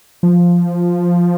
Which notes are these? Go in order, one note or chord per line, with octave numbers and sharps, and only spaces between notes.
F3